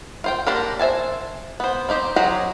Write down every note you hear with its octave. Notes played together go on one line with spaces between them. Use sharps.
F4 C5 G5
A#3 D4 G4 A#4
C5 E5 G#5 A5
B3 C5
C4 D#4 G4 C5
F#3 G#3 G4 G#4 A#5